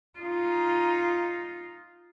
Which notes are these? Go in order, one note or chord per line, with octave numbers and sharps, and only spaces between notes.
D#4 F4